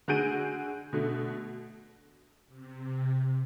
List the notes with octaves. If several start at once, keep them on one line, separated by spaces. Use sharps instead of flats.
D3 F#4 G#4 G6 D7 D#7
B2 D3 A3
C3